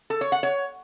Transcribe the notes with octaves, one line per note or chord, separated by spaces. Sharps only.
A4
C#5
F#5
C#5